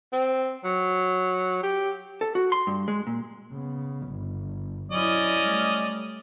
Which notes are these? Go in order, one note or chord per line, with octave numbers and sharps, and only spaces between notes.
C4
F#3
G4
A4
F#4
C6
G2
G#3
A#2
C#3 B3
G1
F#3 C#4 E4 D5 D#5
G3 A3